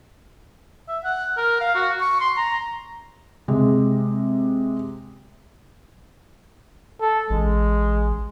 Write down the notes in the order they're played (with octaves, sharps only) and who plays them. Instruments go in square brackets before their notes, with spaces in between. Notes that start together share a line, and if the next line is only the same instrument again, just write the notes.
[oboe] E5
F#5
A#4
F5
F#4
C#6
C6
A#5
[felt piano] C3 G#3
[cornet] A4
[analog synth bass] A1 [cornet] G#3